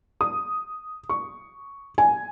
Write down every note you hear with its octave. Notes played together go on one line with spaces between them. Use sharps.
D#6
C#6
G#5